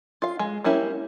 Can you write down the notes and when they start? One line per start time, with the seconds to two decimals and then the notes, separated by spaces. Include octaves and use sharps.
0.22 F4 F5
0.39 G#3
0.64 G3 A#3 C#4 E4 G4